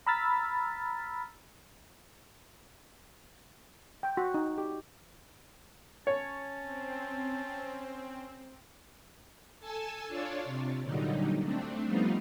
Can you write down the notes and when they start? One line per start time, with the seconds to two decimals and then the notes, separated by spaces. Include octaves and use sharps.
0.06 A#5 B5 E6 F6 A6 B6
4.03 G5
4.17 F#4
4.34 D#4
4.58 G4
6.07 C#4 C#5 A5
6.62 C4
9.60 A4 G#5 A5 E6
10.08 D4 F4 C#5 D5
10.45 C3
10.83 A#2 D3 F#3 G3 D#4
11.42 A3 C4 D4
11.85 F3 G3 A3 B3 D#4 F4